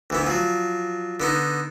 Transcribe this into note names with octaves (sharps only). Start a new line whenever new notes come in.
D2 E3 B3
F3 F#3
D3 B3 D#4